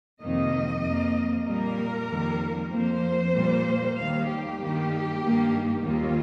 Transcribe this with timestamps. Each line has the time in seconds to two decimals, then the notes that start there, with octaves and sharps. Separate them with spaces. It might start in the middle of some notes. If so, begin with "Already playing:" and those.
0.21 F2 C3 D#3 A#3 D#5
0.83 F2 F3 A#3
1.46 A#2 G3 A#3 A#4
2.08 F2 D#3 G3 A#3
2.71 F2 F3 A#3 C5
3.34 A#2 G3 A#3
3.96 D#2 D#3 G3 A#3 F5
4.28 G4
4.59 G2 D#3 G3 A#3
5.22 G2 D#3 A#3
5.83 D#2 D#3 G3 A#3 F4